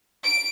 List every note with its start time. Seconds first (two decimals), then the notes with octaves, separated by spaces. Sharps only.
0.24 D7